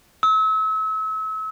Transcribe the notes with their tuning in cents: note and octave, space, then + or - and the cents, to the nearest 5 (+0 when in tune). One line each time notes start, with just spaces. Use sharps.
E6 -35